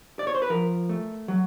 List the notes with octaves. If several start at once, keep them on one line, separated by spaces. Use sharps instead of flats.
D5
C#5
C5
B4
F3 A#4
A3
F#3